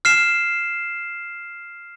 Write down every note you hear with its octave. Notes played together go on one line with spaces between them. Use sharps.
F6 C7 E7